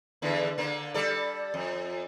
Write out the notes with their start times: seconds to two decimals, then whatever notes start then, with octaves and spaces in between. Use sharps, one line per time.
0.22 E2 D3 E3
0.58 D3 A#3
0.94 G3 A4 D5
1.54 F2